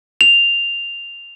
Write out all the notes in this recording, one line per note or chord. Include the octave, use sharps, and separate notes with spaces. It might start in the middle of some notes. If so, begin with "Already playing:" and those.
F7